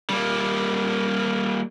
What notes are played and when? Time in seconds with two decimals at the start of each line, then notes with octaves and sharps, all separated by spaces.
0.10 G3 A#3